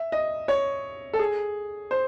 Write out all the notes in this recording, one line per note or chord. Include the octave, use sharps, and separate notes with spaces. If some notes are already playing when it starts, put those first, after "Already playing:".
Already playing: E5
D#5
C#5
A4
G#4
C5